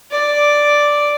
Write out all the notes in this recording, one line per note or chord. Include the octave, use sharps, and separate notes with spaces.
D5